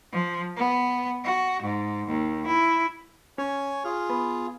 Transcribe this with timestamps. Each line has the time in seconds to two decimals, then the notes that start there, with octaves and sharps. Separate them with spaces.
0.12 F3
0.56 B3
1.24 F#4
1.62 G#2
2.08 D#2
2.46 E4
3.38 C#4 C#5 G#5
3.85 F4 G#4 F6
4.10 B3